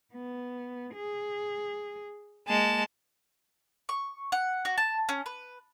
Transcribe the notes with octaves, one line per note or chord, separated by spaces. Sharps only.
B3
G#4
G#3 A#3 A5
C#6
F#5
F#4
A5
C#4
B4